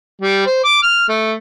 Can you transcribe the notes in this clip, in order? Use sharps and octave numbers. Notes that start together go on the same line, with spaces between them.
G3
C5
D6
F6
A3